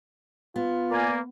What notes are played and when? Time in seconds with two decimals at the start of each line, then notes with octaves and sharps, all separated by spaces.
0.56 B3 F4
0.91 A#3 A#4 D5 G#5